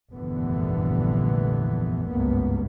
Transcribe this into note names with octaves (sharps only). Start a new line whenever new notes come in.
F1 A#1 G2 D3 E3 B3
G#1 C#2 G2 A#3 B3